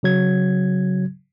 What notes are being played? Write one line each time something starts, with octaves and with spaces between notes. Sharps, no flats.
C#3 F#3 G#6